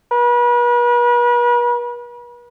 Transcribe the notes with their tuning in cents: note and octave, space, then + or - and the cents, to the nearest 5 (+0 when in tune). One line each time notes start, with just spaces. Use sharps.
B4 -40